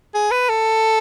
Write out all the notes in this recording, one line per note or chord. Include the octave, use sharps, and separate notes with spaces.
G#4
B4
A4